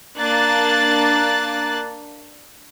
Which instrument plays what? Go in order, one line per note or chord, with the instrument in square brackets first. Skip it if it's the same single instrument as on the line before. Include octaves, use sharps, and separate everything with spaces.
[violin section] A#3 D4 F#6 A6